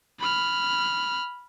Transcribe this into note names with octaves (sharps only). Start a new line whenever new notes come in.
B5 F6